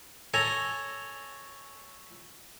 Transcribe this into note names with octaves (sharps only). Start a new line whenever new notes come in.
A4 C#5 G#5 A#5